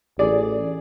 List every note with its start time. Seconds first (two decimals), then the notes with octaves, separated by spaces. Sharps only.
0.19 A1 G#4 D5